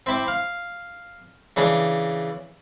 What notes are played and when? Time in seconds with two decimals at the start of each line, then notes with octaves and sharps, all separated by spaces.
0.06 C4 E4 D6
0.28 F5
1.56 C#3 E3 D4